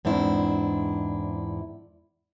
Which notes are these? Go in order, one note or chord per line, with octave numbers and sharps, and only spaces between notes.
E2 G#2 C4 D4 E4 C5